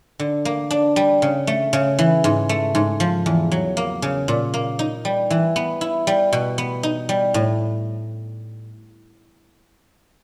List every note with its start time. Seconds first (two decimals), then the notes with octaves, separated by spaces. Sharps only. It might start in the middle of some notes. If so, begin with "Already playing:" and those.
0.19 D3
0.45 A#3
0.70 D4
0.96 G3
1.22 C#3
1.47 A3
1.73 C#3
1.99 E3
2.24 G#2
2.49 A3
2.75 G#2
3.00 F3
3.26 E2
3.51 F#3
3.77 A#3
4.02 C#3
4.28 A#2
4.54 A#3
4.79 D#4
5.05 G3
5.30 E3
5.56 B3
5.81 E4
6.07 G3
6.33 B2
6.58 B3
6.83 D#4
7.09 G3
7.34 A2